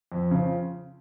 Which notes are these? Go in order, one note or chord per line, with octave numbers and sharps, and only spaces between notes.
F2
C#3 F3